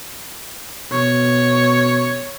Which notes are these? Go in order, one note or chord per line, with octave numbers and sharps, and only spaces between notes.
B2 C#5